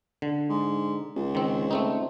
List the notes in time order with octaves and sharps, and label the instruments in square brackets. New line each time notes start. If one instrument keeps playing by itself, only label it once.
[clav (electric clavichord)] D3
[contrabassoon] G#2
C#2
[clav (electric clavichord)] D#3 C4
A3 C4 D#4